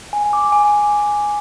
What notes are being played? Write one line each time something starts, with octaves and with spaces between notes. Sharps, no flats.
G#5
D6
G#5